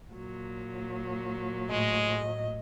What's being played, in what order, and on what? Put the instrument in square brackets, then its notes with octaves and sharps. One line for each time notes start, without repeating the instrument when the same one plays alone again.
[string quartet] A#2 F#3
[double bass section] A2 [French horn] G#3 [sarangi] D#5